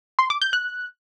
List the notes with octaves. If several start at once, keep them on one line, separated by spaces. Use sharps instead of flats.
C6
D6
G6
F#6